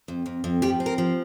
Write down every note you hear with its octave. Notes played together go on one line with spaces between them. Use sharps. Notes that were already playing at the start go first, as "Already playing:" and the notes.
F2
F2
F2
F3 G4
C4
A#4
F3